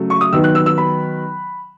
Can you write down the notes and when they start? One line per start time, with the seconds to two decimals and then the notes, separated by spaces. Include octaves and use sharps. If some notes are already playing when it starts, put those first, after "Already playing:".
Already playing: C#3 F#3 A3
0.10 C#6
0.21 D#6
0.33 D#3 F#3 B3 E6
0.44 F#6
0.55 E6
0.66 E6
0.78 B5